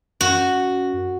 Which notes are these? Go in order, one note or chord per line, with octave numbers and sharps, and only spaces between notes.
F#2 F#4